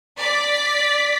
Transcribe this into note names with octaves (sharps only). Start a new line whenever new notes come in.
D5 B6